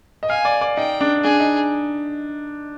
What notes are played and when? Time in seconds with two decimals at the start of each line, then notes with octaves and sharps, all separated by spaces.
0.23 D#5
0.29 F5 G#5
0.45 D5
0.61 D5
0.77 D#4 G5
1.01 D4
1.24 D4 G#4
1.40 D#4